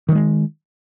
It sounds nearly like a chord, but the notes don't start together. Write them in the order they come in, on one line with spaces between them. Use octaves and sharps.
D#3 F#3 G#3